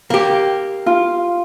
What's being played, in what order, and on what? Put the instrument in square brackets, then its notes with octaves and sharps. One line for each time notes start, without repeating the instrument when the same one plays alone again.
[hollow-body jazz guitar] A#3 G4
[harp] F4